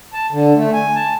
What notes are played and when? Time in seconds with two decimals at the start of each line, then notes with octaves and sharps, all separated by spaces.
0.13 A5
0.32 D3
0.56 A3
0.73 G#5
0.95 A5